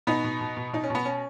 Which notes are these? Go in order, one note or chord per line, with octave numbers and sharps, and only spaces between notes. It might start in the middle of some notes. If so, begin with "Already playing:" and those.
B2 B3 D#4
B2
B2
B2
B2 D#4
C#4
B2 B3
C#4